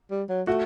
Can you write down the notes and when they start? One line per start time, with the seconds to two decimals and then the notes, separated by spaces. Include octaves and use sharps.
0.11 G3
0.29 F#3
0.47 A3 F#4